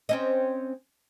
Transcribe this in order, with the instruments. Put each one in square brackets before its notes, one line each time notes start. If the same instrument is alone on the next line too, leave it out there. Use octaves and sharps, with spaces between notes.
[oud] C4 C#4 D#5